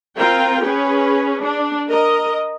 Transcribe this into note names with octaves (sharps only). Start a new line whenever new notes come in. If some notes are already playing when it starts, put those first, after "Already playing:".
C4 F4 A#4 G5
C#4 G#4 B4
D4
A#4 D#5